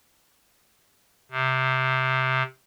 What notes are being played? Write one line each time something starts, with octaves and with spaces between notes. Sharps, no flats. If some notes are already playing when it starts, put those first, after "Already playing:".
C3